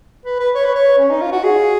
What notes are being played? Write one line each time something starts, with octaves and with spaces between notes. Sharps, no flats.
B4
B4
C#5
B4
C#5
C#4
D#4
F4
F#4
G#4